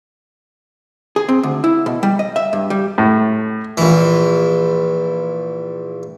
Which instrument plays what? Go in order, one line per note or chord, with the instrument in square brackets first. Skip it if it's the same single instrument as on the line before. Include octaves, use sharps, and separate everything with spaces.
[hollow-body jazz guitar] G#4
C4
D2
E4
B2
G3
D#5
E5
G2
G3
[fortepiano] A2
[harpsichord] A#1 E3